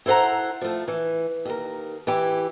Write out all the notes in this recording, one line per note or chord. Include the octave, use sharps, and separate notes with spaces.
E4 A4 C5 F#5 A#5
F3 A3
E3
D#2 A#4
E3 E4 G4